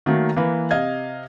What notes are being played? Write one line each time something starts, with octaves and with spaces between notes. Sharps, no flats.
D#3 F#3 A3 A#3
E3 A#3 B4
C3 D#5 F5 G#6